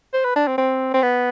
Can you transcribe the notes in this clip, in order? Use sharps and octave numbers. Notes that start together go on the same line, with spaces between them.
C5
B4
D4
C4
C4
C4
B3